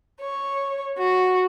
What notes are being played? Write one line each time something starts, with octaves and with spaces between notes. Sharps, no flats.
C#5
F#4